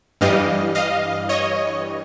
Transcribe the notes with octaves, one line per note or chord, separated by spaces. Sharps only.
G2 E3 G3 D#5 F5
D#5 F5
C#5 D#5